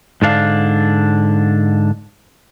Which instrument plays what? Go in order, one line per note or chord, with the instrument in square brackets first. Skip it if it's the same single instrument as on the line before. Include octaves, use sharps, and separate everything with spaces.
[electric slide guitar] G#2 D3 D4 F5